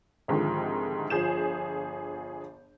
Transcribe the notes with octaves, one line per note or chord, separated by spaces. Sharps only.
C2 G#2 D3 D#3 F3
G1 F3 G#4 G6 E7